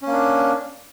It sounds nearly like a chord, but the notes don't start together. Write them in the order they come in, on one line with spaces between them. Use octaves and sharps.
C#4 A#3 D4